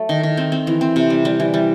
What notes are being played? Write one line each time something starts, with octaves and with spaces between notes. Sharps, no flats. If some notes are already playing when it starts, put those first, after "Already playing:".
Already playing: F#3 A3
D#3
D#3
C4
C4
E3
C4
C3
G3
G3
E3
G3